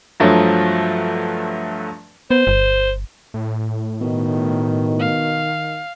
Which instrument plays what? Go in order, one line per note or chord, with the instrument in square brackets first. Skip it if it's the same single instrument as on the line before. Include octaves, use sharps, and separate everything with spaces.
[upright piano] G2 F3 F#3 A3
[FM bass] B3 [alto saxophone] C5
[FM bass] G1
[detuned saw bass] A2
[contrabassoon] B2 [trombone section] D#3
[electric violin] F5